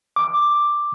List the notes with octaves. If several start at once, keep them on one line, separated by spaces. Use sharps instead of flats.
D6